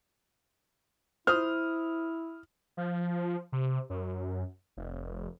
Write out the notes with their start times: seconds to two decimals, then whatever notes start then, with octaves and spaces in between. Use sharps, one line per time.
1.27 E4 C5 D#6 F6
2.77 F3
3.52 C3
3.90 F#2
4.77 F1